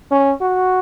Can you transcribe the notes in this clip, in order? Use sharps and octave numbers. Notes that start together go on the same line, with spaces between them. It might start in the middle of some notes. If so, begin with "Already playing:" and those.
C#4
F#4